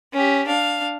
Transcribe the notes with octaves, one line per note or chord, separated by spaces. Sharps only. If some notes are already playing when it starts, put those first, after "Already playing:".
C#4 G4
D4 F5